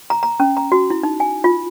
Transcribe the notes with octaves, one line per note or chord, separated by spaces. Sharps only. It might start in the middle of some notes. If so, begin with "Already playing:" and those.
A#5
A#5
C#4
A#5
F#4
E4
D#4
G#5
F4